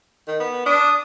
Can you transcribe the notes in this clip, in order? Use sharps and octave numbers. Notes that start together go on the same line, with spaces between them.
D#3
B3
D4 D#6